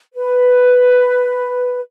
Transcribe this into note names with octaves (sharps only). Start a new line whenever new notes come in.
B4